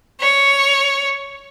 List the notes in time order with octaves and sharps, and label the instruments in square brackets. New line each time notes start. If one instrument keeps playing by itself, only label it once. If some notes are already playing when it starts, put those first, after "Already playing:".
[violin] C#5